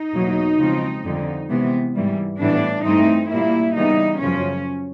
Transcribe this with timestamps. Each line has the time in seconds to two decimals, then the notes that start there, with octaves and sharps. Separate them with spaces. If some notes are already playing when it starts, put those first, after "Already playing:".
Already playing: D#4
0.15 E2 B2 F#3 A#3
0.59 C#3 F3 G#3 C4
1.05 F2 D3 G3
1.50 C3 E3 G#3 B3
1.95 G#2 E3 G3
2.40 A2 E3 G3 B3 D4
2.85 G2 E3 A3 C4 D#4
3.31 A#2 G3 A#3 E4
3.75 C#3 E3 G3 B3 D#4
4.21 F#2 C#3 F3 C#4